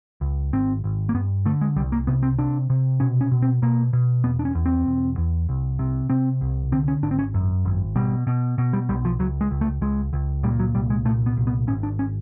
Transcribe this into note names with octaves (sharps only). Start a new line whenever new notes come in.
C#2
G#1 C4
G#1
A#3
G2 B3
D3 A3
G#3
C2 G3
A#3
C3 B3
C4
C3 D4
C3
B2 C#4
C#4
B2
C4
B2 A#3
B2
E1 B3
D4
C#4
E2
C4
E1
E2
C2
C3
C3 C4
C2
D3 C4
C#4
G#1 D4
C4
C#4
F#2
G#1
B2 G3
B2
B2
G3
B1 G3
F3
C#2 F#3
G#3
C#2
A3
C#2 G#3
C#2
A#2 G3
F#3
C2 G3
G#3
A#2 A3
B3
C2
B3
G#1 C#4
D4
C#4